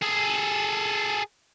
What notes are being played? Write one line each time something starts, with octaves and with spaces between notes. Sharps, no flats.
G#4 A4